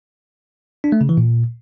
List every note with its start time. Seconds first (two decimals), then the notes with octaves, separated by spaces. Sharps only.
0.84 D4
0.92 A3
1.01 C#3
1.09 E3
1.17 A#2